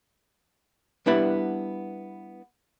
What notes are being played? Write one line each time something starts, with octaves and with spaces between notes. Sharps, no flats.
G3 B3 D4 E4 B4 F#5